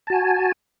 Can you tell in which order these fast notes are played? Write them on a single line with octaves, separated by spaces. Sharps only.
A5 F#4 G#5